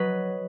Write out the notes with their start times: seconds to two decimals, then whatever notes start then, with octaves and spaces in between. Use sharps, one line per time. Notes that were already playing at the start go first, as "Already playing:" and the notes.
Already playing: F#3 B4 D#5